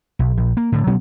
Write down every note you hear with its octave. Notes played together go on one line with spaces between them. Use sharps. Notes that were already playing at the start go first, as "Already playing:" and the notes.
B1
A#1
A#3
A2 D3
B2 F#3 B3 C#4